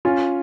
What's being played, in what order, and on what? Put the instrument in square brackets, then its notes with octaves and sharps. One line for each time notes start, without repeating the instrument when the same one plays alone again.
[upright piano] C#4 [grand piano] F4